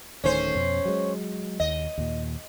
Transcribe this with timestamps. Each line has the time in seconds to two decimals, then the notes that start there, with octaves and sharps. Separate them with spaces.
0.24 D1 D#3 A3 C#4 C5
0.55 F2 B2
0.85 F#3 G#3
1.60 D#2 D#5
1.98 D#2 A#2